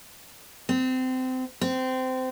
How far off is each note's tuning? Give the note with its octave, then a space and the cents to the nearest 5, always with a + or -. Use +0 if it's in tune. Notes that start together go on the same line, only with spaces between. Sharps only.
C4 -25
C4 -20